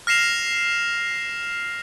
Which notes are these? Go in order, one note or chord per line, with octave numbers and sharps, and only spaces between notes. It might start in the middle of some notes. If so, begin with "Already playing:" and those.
F6 A#6 C7 E7 F7